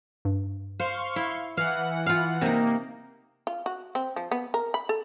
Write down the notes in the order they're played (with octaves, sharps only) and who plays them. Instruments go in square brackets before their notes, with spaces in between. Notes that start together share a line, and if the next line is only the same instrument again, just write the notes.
[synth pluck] G2
[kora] C5 [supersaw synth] F5 C6 C#6
[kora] E4
[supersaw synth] E3 F#5 [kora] F5
[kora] F4 F5
[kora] C3 D#4 [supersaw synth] A#3
[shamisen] F4
F#4
C4
F3
B3
A#4
B5
A4